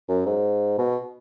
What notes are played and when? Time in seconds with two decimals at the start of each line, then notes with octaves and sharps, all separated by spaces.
0.08 F#2
0.26 G#2
0.78 B2